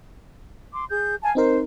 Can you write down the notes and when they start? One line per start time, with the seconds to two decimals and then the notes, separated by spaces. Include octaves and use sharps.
0.73 C6 D6
0.89 G#4 G6
1.22 F5 G#5 A5
1.35 C4 D#4 A#4 C5